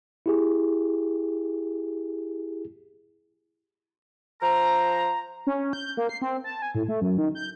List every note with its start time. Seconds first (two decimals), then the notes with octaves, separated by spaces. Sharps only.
0.26 E4 G4 G#4
4.41 F3 C5 A#5
5.47 C#4
5.73 G6
5.97 A#3
6.09 C7
6.22 C4
6.44 A5
6.62 G#5
6.75 A2
6.88 A3
7.01 F#2
7.18 D#3
7.35 G6